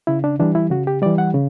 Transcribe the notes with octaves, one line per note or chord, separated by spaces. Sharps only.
C#3 E4
D4
E3 G3 D4
E4
C#3 F#4
G4
E3 G3 D5
F#5
C#3